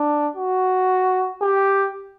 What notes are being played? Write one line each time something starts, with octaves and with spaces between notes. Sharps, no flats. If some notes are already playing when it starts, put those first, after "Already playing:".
Already playing: D4
F#4
G4